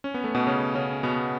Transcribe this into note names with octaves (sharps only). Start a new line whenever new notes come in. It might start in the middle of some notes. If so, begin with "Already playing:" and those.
C#4
B3
A3
B2 B3
C#3 C#4
C#3 C#4
B2 B3